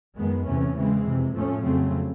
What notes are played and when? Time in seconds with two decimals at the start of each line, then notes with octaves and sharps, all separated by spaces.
0.16 F#2 D#3 G#3 B3
0.46 E2 C3 E3 A3 C#4
0.75 C#3 E3 G#3 C4
1.05 F2 C3 E3
1.34 A2 F3 A3 C#4
1.63 F2 C#3 F#3 A3 C4